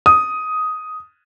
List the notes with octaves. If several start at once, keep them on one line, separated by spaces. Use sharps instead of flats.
D#6